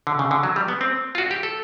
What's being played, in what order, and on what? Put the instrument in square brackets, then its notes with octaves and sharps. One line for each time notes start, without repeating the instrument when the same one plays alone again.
[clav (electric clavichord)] D3
C#3
D3
F#3
G3
B3
C4
F4
F#4
G4
A4